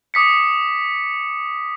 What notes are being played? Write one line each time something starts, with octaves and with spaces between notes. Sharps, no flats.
D6 D#6 B6 C#7